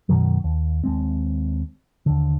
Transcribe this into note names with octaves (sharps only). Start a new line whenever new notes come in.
F#2 B2 D#3 F#3
D#2
D#2 G#3 C4
D#2 D3